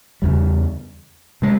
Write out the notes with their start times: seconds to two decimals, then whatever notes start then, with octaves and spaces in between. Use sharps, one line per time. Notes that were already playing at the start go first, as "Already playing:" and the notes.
0.22 E2 C#3 G3
1.42 C3 G#3